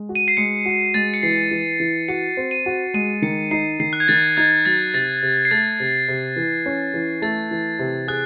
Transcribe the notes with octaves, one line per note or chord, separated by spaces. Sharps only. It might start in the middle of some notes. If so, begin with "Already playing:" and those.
Already playing: G#3
F#4
D#7
C7
G#3 C#7
F#4
G#3 A6
C#7
E3 C7
E3
E3
F#4 C#7
C4
D#7
F#4
G#3 D#7
D#3 C#7
D#4 C7
D#3 C7
F#6
G#6
D#3 A6
D#4 G#6
F#3 A6
C3 A6
C3
C7
A3 A6
C3
C3
E3
C#4
E3
A3 A6
E3
C3
G#4 F#6